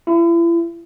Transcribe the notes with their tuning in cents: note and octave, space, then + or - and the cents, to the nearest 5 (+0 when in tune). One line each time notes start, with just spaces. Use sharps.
E4 +40